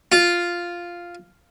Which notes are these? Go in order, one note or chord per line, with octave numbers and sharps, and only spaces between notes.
F4